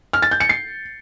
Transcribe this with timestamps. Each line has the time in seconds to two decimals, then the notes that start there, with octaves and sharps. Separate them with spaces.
0.13 F6
0.22 A6
0.31 G6
0.40 C#7
0.49 C7